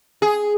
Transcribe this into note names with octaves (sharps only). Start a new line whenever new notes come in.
G#4